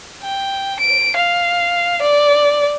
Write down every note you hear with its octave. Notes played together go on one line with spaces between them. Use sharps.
G5
D7
F5
D5